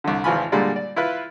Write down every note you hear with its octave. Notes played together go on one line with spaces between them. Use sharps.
C2 D3
G#1 E3 F3 F4 G#5 B5
A#2 D3 G3 G#3 A#3 D5
D5
E4 F4 B4